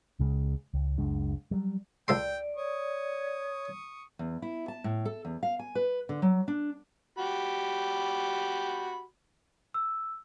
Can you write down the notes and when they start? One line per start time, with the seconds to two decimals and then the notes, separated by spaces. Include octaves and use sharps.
0.19 C#2 C#3 G#3
0.74 C#2
0.98 F#1 C#2 G#3 D4
1.51 F#3 G3
2.08 C#2 A4 D5 G5 C6
2.56 C#5 C#6 D#6
4.19 E2
4.42 E4
4.68 A5
4.84 A2
5.05 A4
5.25 E2
5.43 F5
5.59 G#5
5.75 B4
6.09 D3
6.22 F#3
6.48 D4
7.18 F#4 G4 B5
9.74 E6